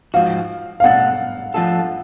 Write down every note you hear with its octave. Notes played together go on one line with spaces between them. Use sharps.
G#2 F3 F#4 F5
F5
B2 A3 D4 F#5
F3 A3 D4 F4 A4